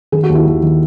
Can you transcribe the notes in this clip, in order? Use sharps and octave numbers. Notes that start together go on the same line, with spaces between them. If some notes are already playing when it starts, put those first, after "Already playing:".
D#3 G#4
F#4
D#2
E4
D#2
D#3